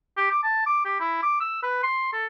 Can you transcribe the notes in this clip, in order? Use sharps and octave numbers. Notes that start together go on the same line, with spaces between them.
G4
D6
A5
D6
G4
E4
D6
E6
B4
C6
A4